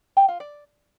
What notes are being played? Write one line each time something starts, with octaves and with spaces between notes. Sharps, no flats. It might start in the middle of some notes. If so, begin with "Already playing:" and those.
G4
F4
D5